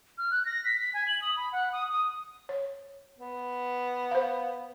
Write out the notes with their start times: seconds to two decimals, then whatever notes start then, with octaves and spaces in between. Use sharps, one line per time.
0.18 F6
0.31 F#6
0.46 A#6
0.65 B6
0.81 B6
0.94 G#5
1.08 F#7
1.22 D#6
1.37 B5
1.52 F#5
1.73 D#6
1.91 D#6
2.49 C#5
3.18 B3
4.11 C5 F5